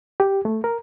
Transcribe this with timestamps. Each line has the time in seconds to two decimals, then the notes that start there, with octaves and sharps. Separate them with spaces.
0.20 G4
0.45 A3
0.64 A#4